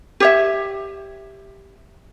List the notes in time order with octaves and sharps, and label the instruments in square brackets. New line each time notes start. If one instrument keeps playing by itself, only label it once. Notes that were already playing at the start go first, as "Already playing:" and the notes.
[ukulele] G4 C#5 E5